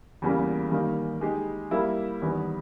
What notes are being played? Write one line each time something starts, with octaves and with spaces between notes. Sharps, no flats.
E2 C#3 E3 G3 A#3
D#3 G3 A#3
G#3 D#4 G4
G3 A#3 E4 A#4 E5
E2 D#3 G3 B3